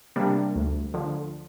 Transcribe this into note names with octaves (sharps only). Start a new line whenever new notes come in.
C3 G3 A#3 D4
D2
D3 F3